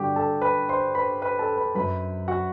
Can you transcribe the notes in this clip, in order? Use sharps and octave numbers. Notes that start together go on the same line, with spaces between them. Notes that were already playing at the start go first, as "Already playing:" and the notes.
Already playing: G2 D3 G3 F#4 G4 G5
A4 A5
B4 B5
C5 C6
B4 B5
B4 B5
A4 A5
B4 B5
F#2 F#3 B4 B5
F#4 F#5